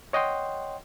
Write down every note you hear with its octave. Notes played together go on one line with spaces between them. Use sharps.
C#5 D#5 F#5 G5 C6